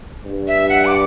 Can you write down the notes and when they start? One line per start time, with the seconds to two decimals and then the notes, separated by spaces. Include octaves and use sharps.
0.24 G2
0.48 E5
0.69 F#5
0.86 D6